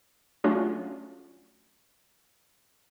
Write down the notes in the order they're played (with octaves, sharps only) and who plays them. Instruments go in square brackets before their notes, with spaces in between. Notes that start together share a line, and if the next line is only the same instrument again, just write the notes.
[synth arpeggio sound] F#3 A3 C#4 D4 F4 F#4